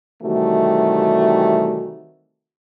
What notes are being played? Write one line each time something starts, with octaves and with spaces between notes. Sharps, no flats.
C3 D#3 E3 G3 A3 F#4